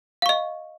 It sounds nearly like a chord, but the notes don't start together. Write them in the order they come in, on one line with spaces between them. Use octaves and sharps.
F5 C#6 D#5